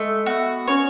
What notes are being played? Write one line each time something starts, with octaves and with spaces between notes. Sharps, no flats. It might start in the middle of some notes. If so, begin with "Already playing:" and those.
Already playing: G#3 A3
B3 F#4
C#4 C#5